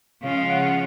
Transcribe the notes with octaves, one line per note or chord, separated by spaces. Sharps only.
C#3 F3 G#3 C#4 F4 F5
F5
F#5